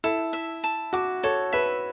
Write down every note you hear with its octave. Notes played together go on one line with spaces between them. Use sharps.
E4 A4
E5
A5
F#4 D6
A4 C#5
B4 E5